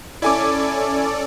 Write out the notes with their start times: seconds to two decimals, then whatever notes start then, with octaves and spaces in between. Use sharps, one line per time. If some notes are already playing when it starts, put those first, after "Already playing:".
0.22 C#4 E4 A4 D5 G#5 D6